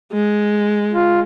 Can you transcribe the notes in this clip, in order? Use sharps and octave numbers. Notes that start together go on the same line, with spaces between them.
G#3
F4